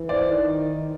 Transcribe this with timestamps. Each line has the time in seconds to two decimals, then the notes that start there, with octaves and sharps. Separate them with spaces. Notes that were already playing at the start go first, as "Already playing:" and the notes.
Already playing: E3
0.09 C5 D5
0.30 D#3